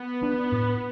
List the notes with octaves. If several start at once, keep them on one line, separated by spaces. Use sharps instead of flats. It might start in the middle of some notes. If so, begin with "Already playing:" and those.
Already playing: B3
G3 D4
A2